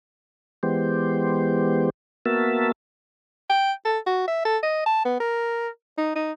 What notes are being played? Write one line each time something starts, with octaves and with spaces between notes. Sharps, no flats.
E3 G#3 B3 G4 C5
A#3 B3 F#4 A#4 E5 A5
G5
A4
F#4
E5
A4
D#5
A5
B3
A#4
D#4
D#4